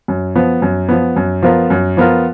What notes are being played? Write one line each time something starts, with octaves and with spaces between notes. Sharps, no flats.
F#2
F3 B3
F#2
F3 B3
F#2
F3 B3 F4 A#4
F#2
F3 B3 F4 A#4